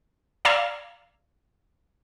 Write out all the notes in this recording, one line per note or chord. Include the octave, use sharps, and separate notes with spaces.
D5 F5 A#5 E6 G#6